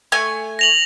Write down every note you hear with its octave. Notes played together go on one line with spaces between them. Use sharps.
A3 G#5
A#6 F7 F#7